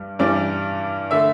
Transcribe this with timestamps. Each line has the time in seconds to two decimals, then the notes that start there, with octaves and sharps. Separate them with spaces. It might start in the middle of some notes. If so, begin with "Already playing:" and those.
Already playing: G2 G3
0.19 G2 E3 G3 D5
1.11 D3 A3 E5